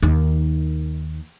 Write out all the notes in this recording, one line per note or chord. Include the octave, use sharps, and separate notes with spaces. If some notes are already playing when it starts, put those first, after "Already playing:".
D#2 D#3